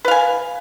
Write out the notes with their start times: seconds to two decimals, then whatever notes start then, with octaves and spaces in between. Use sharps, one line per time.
0.05 B4
0.08 F5
0.11 G#5